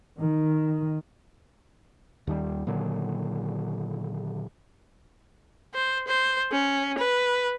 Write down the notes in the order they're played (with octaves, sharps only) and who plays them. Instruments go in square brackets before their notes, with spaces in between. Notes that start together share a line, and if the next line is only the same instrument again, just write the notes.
[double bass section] D#3
[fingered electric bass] D#2 D#3 G3
A#2 D3 D#3 F#3
[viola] C5
C5
C#4
B4